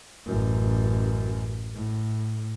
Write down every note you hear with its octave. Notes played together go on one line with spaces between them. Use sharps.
A1 F#2
A2